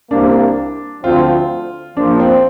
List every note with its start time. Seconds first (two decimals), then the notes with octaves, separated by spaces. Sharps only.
0.11 C2 C3 A#3 D4
1.04 D2 D3 F3 C4 F4
1.96 A#1 A#2 F3 D4
2.20 C4